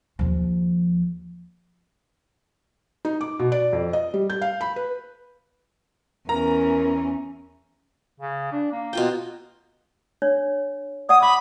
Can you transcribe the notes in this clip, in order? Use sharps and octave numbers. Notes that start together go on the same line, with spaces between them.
D#2 F3
D#4
D6
B2
D5
F2
D#5
G3
G6
F5
B5
B4
E2 C#4 A#4 A#5
C#3
D4
A#3
B2 F4 G5
D4 C#5
D5 F#5 D#6
B5 D6 D#6